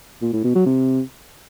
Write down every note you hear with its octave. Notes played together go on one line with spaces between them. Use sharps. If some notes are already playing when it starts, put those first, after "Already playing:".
A#2
A2
B2
F#3
C3